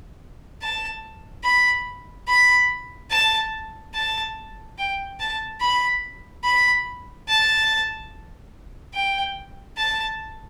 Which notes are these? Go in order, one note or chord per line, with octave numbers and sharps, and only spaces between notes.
A5
B5
B5
A5
A5
G5
A5
B5
B5
A5
G5
A5